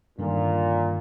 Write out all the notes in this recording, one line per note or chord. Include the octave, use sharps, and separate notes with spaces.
G2 A#2 D3 D#3